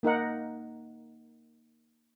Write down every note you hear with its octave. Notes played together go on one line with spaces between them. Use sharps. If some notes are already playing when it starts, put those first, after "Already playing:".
A#3 D#4 A#4 F#5